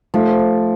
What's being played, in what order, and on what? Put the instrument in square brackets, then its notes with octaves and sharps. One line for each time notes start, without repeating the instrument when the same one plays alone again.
[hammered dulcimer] F3 [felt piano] A3